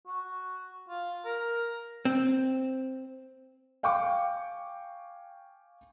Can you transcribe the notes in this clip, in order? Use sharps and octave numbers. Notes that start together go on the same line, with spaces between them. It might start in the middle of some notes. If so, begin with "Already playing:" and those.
F#4
F4
A#4
C4
F5 G5 G#5 C#6 D6